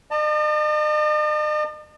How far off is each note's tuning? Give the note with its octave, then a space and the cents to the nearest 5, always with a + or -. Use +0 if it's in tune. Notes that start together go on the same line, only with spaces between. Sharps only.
D#5 -45 A5 +35